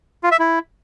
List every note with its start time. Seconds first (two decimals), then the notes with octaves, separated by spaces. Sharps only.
0.23 F4
0.31 E5
0.40 E4